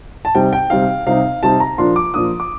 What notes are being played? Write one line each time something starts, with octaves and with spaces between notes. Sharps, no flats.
A5
C3 G3 C4 D#4 G5
G5
C3 G3 C4 D#4 F5
C3 G3 C4 D#4 F5
C3 G3 C4 D#4 A5
A#5
A#2 F3 A#3 D4 C6
D6
A#2 F3 A#3 D4 D#6
D6